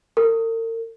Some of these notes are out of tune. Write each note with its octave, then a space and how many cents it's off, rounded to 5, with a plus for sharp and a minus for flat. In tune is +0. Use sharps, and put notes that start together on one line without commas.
A#4 -45